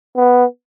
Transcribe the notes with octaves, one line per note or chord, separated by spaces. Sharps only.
B3